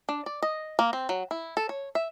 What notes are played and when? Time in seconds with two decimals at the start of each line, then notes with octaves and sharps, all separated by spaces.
0.09 D4
0.26 D5
0.42 D#5
0.79 A#3
0.93 C4
1.09 F#3
1.31 E4
1.57 A4
1.69 C#5
1.95 E5